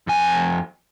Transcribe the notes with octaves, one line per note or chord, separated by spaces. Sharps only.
F2 G#5